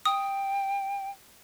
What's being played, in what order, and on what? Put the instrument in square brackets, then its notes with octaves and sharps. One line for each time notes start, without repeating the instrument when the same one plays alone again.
[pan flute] G5 [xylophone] D#6